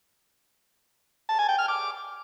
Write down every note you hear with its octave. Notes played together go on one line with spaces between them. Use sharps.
A5
G#5
G5
F6
D6